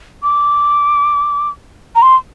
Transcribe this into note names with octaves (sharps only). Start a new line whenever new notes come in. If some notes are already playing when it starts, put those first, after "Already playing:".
D6
A#5
C6